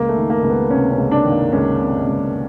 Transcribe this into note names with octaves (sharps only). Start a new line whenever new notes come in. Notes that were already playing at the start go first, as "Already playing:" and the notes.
Already playing: C#2 A#3
A3
D#3
A#3
C#2
B3
C3 C#4
C#4
C#2
D4
D#3
A#3
C#2 C#4
C3
C#2